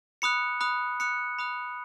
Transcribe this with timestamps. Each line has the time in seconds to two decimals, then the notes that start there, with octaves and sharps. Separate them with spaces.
0.22 B5 D#6 F#6 C#7
0.61 B5 D#6 F#6
1.00 B5 D#6 F#6 C#7
1.39 B5 D#6 F#6